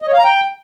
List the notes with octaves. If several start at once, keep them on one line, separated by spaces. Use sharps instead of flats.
D#5
C#5
F5
A#5
G5